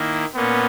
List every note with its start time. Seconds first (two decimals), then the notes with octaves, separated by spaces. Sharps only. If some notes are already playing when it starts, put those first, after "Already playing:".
Already playing: D#3 A#3 E4
0.35 A#2 A#3 B3 C#4